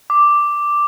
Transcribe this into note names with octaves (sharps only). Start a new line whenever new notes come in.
D6